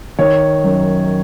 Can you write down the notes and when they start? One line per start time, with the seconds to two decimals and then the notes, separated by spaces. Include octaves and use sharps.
0.19 D#3 C#5
0.64 F#2